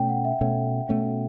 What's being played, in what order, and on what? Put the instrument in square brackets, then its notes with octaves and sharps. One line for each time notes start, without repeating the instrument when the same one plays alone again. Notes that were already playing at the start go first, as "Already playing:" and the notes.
Already playing: [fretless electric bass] B2 A3 C#4 [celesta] G5
[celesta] F#5
E5
[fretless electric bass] B2 A3 C#4
B2 A3 C#4